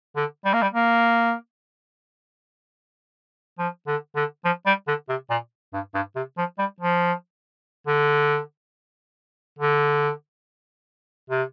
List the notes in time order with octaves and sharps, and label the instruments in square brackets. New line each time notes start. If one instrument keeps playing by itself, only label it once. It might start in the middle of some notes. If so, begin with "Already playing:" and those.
[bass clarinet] D3
G3
A#3
G3
A#3
F3
D3
D3
F3
G3
D3
C3
A#2
G2
G2
C3
F3
G3
F3
D3
D3
C3